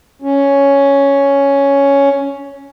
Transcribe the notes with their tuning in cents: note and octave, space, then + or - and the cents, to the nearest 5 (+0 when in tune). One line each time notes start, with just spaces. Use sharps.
C#4 +5